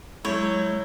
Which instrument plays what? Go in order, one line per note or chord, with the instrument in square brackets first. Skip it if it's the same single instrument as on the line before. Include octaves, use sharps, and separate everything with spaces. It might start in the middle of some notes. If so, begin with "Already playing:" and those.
[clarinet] F#3 [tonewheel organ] G#3 G6 [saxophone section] E4 [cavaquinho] C#5